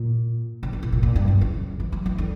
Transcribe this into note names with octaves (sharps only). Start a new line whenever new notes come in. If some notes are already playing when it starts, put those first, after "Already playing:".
Already playing: A#2
C#3
C#3
B2
A#2
A#2
G2
F#2
C#3
E3
F#3
E3
D3